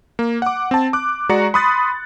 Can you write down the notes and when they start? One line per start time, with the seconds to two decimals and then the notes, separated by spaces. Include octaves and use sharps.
0.19 A#3
0.42 F#5 D6
0.71 C4 A5
0.93 D6 F#6
1.29 G#3 F#4 D5 A#5 C#7
1.54 B5 C6 D#6 F#6 A6